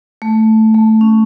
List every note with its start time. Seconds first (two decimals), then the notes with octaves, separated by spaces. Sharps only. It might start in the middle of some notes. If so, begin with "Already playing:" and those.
0.22 A3
0.74 A3
1.01 C#4